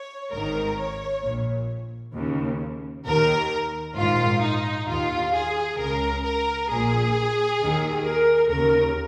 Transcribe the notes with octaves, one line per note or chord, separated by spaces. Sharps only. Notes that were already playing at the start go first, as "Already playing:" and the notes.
Already playing: C#5
G#1 G#2 D#3 A#4
C#5
A#1 A#2
D#2 C#3
D#2 D#3 A#4
A#1 G#2 D#3 F4
D#4
D#2 D#3 F4
G#4
C#2 C#3 A#4
A#4
A#1 A#2 G#4
D#2 D#3
A#4
D#2 C#3 A#4